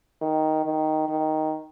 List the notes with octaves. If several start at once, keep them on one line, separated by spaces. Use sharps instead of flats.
D#3
D#3
D#3